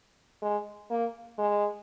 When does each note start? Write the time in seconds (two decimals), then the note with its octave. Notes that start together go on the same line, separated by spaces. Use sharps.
0.42 G#3
0.91 A#3
1.39 G#3